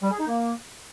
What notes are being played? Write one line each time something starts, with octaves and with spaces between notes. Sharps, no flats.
G3
G#4
D#4
A#3